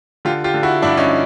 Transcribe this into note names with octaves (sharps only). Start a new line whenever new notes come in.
D3 F4 G4
F4 G4
D3
E4 F#4
G2 D4 E4
C#4 D#4